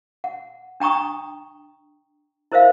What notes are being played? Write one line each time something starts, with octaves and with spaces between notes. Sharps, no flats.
F#5
D4 G5 A#5 C#6 D#6
E4 A#4 C5 E5 F5